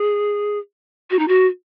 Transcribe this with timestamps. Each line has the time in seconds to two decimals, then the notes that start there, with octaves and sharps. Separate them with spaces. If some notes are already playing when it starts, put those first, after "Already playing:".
Already playing: G#4
1.10 F#4
1.19 D#4
1.28 F#4